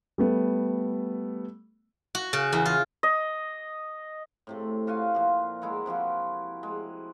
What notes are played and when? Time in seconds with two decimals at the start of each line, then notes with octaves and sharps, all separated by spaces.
0.18 G3 A3 B3
2.15 F#4
2.33 C#3
2.53 E2
2.66 F4
3.03 D#5
4.47 A2 C3 A3
4.87 F4 F#4 F5 G#5
5.15 A#2 F3
5.62 G#3 E4 A#4 F#5
5.86 C3 F3 E4 F#4
6.63 G#3